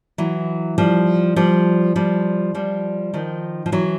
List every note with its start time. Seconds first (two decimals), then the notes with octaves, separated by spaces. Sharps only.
0.18 E3 F#3
0.78 F3 G3
1.36 F3 G3
1.96 F3 G3
2.55 F3 G3
3.14 D#3 F3
3.66 F3
3.72 E3 F#3